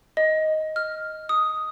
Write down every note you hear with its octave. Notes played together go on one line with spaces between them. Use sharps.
D#5
F6
D#6